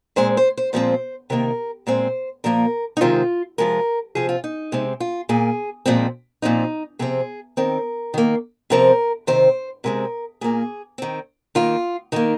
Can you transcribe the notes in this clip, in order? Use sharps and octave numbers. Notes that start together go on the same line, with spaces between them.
A#2 G#3 C4 C5
C5
C5
A#2 F3 G#3 C4 C5
C3 D#3 A#3 A#4
A#2 G#3 C4 C5
A#2 F3 A#3 A#4
D#4
C3 D#3 G#3 C4 F4
C3 F3 G#3 A#4
C3 F3 C4 G#4
F4
D#4
C3 G#3 C4
F4
A#2 A#3 G#4
A#2 F3 G#3 C4
A#2 F3 C4 D#4
C3 F3 C4 G#4
D#3 C4 A#4
D#3 A#3
C3 F3 C4 A#4
C3 D#3 C4 C5
C3 G#3 C4 A#4
A#2 A#3 G#4
D#3 C4
D#3 A#3 F4
D#3 A#3 D#4